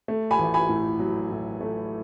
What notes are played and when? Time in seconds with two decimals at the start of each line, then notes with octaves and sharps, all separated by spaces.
0.08 A3
0.31 G#5 B5
0.39 A1
0.54 G#5 B5
0.69 A2
0.99 F#3
1.31 A2
1.61 A3